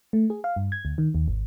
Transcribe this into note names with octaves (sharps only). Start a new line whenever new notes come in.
A3
G#4
F5
G2
G#6
D2
D#3
D#2
G#1